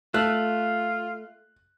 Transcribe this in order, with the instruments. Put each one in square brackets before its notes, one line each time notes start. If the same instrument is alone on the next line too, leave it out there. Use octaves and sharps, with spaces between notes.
[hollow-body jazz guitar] A3 [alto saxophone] F4 [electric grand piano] F#6